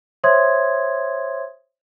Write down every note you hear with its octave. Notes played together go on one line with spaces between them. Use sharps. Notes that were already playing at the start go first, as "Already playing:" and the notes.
C5 C#5 E5 C6 D#6 G#6